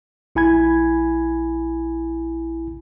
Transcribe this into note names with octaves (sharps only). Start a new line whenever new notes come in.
A#1 E4 G#5 B5 G#6